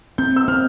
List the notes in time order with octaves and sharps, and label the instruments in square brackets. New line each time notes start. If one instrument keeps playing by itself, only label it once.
[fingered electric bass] C4 [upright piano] G6
[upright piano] E6
[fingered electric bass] C4 [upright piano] F6